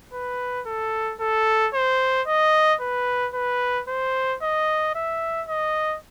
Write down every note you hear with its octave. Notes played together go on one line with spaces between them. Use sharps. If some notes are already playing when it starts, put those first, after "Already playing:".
B4
A4
A4
C5
D#5
B4
B4
C5
D#5
E5
D#5